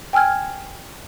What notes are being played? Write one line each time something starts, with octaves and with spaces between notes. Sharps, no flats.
G5 G#5 E6 F6 G#6